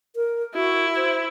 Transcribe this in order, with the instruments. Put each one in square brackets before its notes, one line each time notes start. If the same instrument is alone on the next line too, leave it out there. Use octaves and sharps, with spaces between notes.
[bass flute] A#4
[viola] E4 [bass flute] F#4
[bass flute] C5